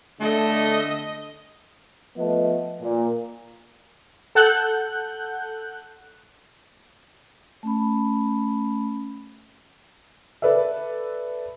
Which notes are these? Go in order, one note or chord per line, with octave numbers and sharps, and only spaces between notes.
D3 A3 D#5
F3 A3 B3 B4 D#5
A#2
A4 F#5 F#6 G6
A3 C#4 B5
A4 B4 D5 E5